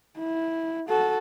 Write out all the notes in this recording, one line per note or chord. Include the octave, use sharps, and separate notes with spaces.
E4
F#4 A4